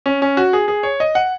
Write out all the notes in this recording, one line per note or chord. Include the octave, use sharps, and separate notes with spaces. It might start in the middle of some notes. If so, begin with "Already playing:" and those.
C#4
C#4
F#4
G#4
G#4
C#5
D#5
F#5